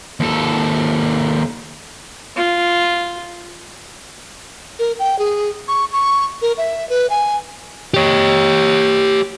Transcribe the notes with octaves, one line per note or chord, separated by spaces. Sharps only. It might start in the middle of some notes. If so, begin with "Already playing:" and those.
D#2 A4
F4
A#4
G5
G#4
C#6
C#6
A#4
E5
B4
G#5
G4 C#5